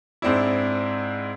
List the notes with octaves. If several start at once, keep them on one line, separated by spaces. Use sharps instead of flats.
G#2 C4 D4 E4